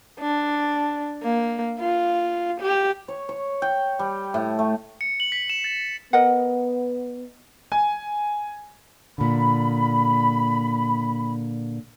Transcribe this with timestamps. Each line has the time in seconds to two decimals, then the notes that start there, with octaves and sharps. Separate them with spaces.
0.20 D4
1.23 A#3
1.80 F4
2.61 G4
3.08 C#5
3.29 C#5
3.62 G5
3.99 G3
4.34 A2
4.59 A3
5.01 C#7
5.20 F#7
5.32 B6
5.50 E7
5.64 A6
6.13 B3 A#4 D#5 F#5
7.72 G#5
9.18 A#2 D3 B5